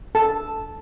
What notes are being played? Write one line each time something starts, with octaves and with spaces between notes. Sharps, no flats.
A4 A5